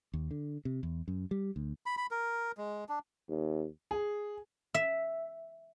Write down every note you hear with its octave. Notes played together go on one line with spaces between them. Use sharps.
D#2
D3
C3
E2
F#2
G3
D2
B5
B5
A#4
G#3
D4
D#2
G#4
E5